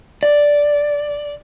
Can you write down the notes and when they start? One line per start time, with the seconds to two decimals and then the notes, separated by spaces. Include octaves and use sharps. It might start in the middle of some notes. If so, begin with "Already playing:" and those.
0.23 D5